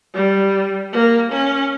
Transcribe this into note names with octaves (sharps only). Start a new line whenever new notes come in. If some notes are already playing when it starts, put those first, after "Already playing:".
G3
A#3
C#4